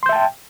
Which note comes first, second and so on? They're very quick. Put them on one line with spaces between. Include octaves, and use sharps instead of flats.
C6 G6 E5 A5 G5